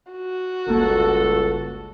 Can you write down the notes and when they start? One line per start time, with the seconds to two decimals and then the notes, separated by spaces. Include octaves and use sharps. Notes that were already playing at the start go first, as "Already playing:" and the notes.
0.12 F#4
0.68 G1 C#2 A#3 A4